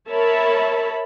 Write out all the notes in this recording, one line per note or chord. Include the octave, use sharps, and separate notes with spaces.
A#4 C#5 E5 A5 B5